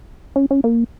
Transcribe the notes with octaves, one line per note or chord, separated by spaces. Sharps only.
C#4
C#4
A#3